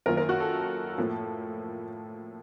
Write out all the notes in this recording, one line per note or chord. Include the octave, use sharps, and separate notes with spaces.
F#2 D#3 A#3 F4 A#4
A#4
F#4
A4
A2 F3 A#3